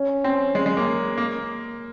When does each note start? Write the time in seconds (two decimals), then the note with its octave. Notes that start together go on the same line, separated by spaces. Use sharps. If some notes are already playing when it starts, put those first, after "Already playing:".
Already playing: C#4
0.24 C4
0.55 G#3
0.66 G#3
0.77 A#3
1.18 A#3